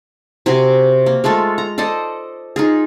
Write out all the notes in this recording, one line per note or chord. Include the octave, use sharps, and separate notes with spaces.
C3 F#4 G#5 C6
A#3
G#3 A3 F4 A4
A#5
A4 C5 D5 D#5
D#4 F4 G#4